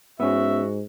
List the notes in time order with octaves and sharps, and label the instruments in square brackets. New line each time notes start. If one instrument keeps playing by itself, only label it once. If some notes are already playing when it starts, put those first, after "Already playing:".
[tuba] G#2 [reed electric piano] B3 C#4 [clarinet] F#4 [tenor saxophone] E5